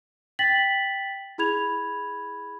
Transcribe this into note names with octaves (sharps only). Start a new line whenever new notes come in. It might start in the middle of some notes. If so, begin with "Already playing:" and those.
G5 A6 B6 F#7
E4 G#4 B5 G#6 F7